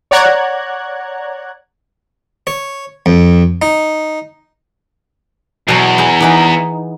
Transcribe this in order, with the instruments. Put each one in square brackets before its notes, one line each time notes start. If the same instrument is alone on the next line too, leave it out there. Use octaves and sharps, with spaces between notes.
[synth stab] C#5 D5 F#5 A#5 F#6 G#6
[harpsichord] C#5
F2
D#4
[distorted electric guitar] E2 [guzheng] B2 F#3
[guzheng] G#4 G5 A#5
E3 B3 D#4